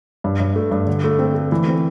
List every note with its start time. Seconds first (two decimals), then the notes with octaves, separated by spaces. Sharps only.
0.24 G2
0.40 G2
0.56 A3
0.71 G2
0.87 D3
1.04 A3
1.19 C4
1.35 A3
1.52 E3
1.68 C4